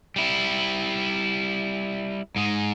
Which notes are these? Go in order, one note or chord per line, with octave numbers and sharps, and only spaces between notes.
G3 E4
G#2 G#3